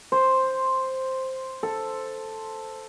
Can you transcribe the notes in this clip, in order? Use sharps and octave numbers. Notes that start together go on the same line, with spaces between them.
C5
A4